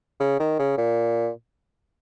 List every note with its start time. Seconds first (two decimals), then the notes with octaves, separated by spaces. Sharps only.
0.20 C#3
0.40 D#3
0.59 C#3
0.78 A#2